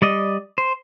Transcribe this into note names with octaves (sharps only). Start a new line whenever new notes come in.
G3 D5 D#5
C5